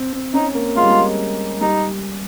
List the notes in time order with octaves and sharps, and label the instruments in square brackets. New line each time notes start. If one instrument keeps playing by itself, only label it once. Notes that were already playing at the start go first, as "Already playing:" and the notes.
Already playing: [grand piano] C4
C4
[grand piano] C#4 [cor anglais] D#4
[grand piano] A#3
[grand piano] G#3 [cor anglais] F4
[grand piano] G3
G#3
[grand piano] G3 [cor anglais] D#4